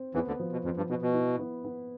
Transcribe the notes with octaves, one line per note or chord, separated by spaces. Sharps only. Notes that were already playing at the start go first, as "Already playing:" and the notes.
Already playing: C4
E2 E3 B3
D2 D3
F3
B2
F2 F3
G2
B2 B3
B2
E4
B3
B3